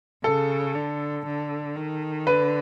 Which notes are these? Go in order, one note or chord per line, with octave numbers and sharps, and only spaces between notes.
C#3 A4
D3
D3
D#3
D3 B4